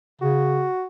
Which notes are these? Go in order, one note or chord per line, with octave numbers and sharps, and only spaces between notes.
C#3 F#4